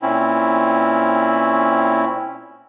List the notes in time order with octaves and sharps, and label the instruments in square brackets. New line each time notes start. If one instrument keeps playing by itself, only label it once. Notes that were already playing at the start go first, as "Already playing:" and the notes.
[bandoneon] A#2 C4 C#4 E4